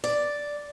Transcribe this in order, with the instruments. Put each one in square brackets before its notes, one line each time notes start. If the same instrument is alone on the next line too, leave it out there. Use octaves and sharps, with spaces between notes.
[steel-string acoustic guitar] D5